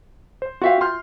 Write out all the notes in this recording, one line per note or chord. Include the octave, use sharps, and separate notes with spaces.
C5
F4 F#4 E5 F5 G5
F4 C6 F6 G6